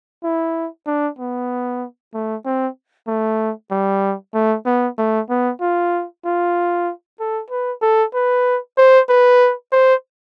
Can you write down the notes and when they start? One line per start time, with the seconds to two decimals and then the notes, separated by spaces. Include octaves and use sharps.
0.24 E4
0.87 D4
1.19 B3
2.14 A3
2.46 C4
3.08 A3
3.71 G3
4.34 A3
4.66 B3
4.98 A3
5.29 B3
5.61 F4
6.25 F4
7.20 A4
7.50 B4
7.82 A4
8.14 B4
8.78 C5
9.09 B4
9.72 C5